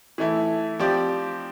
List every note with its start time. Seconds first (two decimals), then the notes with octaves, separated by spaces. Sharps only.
0.18 E3 A3 E4
0.79 F3 C4 G4 D5